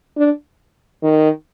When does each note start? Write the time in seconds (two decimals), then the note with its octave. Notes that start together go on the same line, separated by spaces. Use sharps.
0.17 D4
1.03 D#3